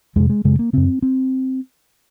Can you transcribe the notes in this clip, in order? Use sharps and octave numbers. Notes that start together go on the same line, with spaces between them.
F2 C3 G#3
G#3
F#2 C#3 G#3
A#3
F#2 C#3 C4
C4